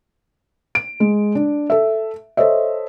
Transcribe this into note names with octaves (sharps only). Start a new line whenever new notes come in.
D7
G#3
D4
A4 E5
A4 C5 C#5 D#5 E5